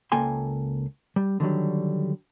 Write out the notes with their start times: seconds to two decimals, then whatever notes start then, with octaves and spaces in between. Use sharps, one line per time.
0.12 C#2 A#3 A4 G5 G#5 C6
1.16 G3
1.40 D3 D#3 F#3 G3